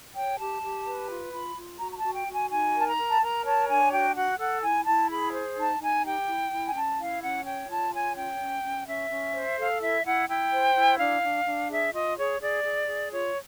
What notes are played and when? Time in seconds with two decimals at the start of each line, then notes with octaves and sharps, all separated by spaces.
0.15 C#5 G5
0.38 G4 A5
0.62 G4
0.86 B4
1.09 F4
1.32 F4 B5
1.56 F4
1.80 F#4 A#5
1.92 A#5
1.98 A5
2.04 F#4
2.15 G5
2.27 F#4
2.32 G#5
2.50 D#4 G#5
2.74 A#4 A5
2.86 A#5
2.97 A#4
3.10 A5
3.20 A#4 A#5
3.44 C#5 A5
3.68 D4 G#5
3.91 F#4 G5
4.15 F#4 F#5
4.39 A4 F#5
4.62 E4 G#5
4.86 E4 A5
5.09 G#4 B5
5.33 C5
5.57 D#4 A5
5.80 D#4 G#5
6.04 G4 G5
6.27 E4
6.51 E4
6.67 G#5
6.74 C#4 A5
6.98 E4 F5
7.21 C#4 F#5
7.45 C#5 G5
7.69 F4 A5
7.92 C#5 G#5
8.16 C#4 G5
8.40 C#4
8.63 C#4
8.86 C#4 E5
9.10 C#4
9.33 C5
9.57 A4 F5
9.80 E4 E5
10.04 E4 F#5
10.28 E4 G5
10.51 C5
10.74 E4
10.98 D4 F5
11.22 D4
11.45 D4
11.68 G#4 E5
11.92 F4 D#5
12.16 G#4 C#5
12.40 G#4 D5
12.63 G#4
12.87 G#4
13.10 F4 C#5